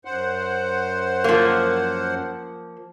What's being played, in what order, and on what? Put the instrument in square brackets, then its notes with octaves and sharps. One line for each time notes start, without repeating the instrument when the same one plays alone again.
[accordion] F#2 C5 F#5
[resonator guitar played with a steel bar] F3 A#3